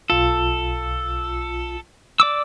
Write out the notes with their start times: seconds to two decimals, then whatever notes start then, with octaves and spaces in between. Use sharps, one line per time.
0.10 B1 F4 A4
2.20 D5 D6 E6